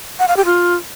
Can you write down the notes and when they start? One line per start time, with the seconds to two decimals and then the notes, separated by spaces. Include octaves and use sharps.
0.19 F#5
0.28 F5
0.36 G4
0.45 F4